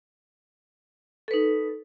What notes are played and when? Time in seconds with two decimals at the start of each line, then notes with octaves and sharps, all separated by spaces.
1.28 A4
1.31 B4
1.34 D#4